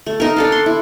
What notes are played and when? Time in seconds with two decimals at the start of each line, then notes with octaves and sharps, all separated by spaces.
0.06 A3
0.20 D#4 A#4
0.36 D4 A4 F5
0.52 C6
0.66 E4